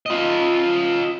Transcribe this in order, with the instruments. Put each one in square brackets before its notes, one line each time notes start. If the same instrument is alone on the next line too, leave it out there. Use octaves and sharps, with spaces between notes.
[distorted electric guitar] F4 D#5